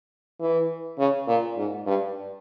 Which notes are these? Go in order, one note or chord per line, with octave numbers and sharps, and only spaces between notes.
E3
C#3
A#2
G#2
G2